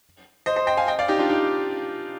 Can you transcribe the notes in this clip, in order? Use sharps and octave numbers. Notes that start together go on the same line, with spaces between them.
C5 D#5
C5 D#5
D#5 G5
F5 G#5
D#5 G5
D5 F5
D#4 G4
D4 F4
D#4 G4